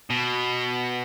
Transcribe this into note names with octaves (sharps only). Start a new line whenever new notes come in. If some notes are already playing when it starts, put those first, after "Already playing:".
B2